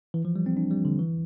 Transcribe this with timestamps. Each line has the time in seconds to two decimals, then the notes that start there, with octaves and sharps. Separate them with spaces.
0.14 E3
0.25 F3
0.36 G3
0.46 C4
0.57 D4
0.71 G3
0.85 D3
0.99 E3